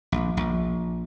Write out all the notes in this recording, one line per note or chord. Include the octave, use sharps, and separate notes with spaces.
A#1
A#1